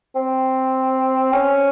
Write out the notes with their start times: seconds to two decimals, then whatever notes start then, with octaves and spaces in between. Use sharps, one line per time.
0.15 C4
1.33 C#4